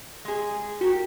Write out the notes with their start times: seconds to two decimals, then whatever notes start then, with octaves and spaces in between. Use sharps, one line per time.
0.25 G#3 G#4
0.81 F#4 G4 A#4 G5